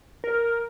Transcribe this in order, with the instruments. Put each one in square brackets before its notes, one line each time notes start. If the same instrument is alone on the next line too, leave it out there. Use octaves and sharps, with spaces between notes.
[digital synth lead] A#4